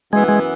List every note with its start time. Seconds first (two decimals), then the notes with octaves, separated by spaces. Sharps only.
0.13 F#2 E3 G#3 B3
0.29 G#3